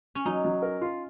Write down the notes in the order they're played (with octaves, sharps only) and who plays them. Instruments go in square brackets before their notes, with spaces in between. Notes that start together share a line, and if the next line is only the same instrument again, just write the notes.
[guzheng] C#4
[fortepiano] F#3 [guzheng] D#4
[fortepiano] F#3
A#4
F4